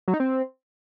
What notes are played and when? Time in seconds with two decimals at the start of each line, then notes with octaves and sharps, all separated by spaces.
0.08 F#3
0.14 D#4
0.20 C4